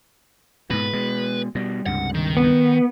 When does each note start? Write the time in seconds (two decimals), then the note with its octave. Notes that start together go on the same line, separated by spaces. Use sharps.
0.70 G#2 B2 B4
0.93 B2 G#3
1.55 B2 G3
1.86 C#2 G2 C3 F#5
2.14 D#3
2.37 B3